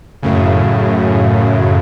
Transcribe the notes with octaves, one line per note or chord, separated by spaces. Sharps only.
F#2 A2 C#3